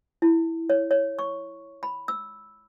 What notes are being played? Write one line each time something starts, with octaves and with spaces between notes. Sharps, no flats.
E4
C#5
C#5
C#6
B5
E6